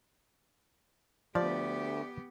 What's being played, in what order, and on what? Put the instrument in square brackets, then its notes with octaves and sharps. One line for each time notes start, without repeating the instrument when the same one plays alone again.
[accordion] D2 [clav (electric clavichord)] F3 [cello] B3 G4 [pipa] D5